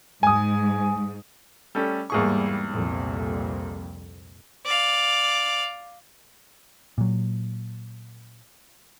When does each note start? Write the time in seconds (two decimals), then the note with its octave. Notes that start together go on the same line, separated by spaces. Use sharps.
0.23 G#2 G#5 D#6
1.75 G3 A3 C#4
2.10 E2 G#2 G3 A#3 G#4 C#6
2.71 C2 F2 A#2
4.66 D5 F5
6.98 A#2 F#3